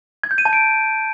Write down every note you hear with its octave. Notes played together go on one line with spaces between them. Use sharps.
G#6
G6
D#7
A5
D7